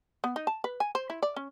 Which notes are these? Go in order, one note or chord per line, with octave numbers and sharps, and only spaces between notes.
B3
D#4
A5
B4
G#5
C5
E4
D5
C#4